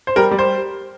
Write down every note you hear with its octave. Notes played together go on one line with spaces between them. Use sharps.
C5
G3 A#4
G3
C5